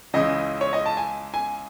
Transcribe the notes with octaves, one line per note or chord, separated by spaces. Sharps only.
C#2 C#3 E3 D#5
C#5
D#5
A5
G#5
G#5